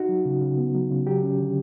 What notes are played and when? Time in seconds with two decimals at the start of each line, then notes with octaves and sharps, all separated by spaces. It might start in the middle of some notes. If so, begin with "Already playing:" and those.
Already playing: D#4 F#4
0.09 F#3
0.25 C#3
0.41 C#3
0.58 B3
0.74 F#3
0.90 C#3
1.07 F#3 G4
1.23 C#4
1.39 D3